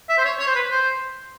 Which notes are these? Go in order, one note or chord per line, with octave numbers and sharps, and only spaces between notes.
E5
C5
C#5
C#5
C5
B4
C5